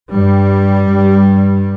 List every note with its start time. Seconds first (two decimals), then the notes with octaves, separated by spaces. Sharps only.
0.12 G2 G3
0.91 G2